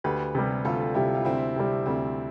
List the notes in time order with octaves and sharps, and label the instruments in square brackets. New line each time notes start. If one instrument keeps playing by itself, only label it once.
[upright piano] D2 [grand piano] G4 B4
[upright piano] C3 G3
[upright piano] D2 [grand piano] F4 A4
[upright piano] C3 G3 [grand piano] E4 G4
[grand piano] F4
[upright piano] D2 [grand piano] C4 E4
[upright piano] C3 G3
[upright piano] D2 [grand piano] C4